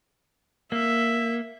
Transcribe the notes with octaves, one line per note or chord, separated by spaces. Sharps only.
A#3 E5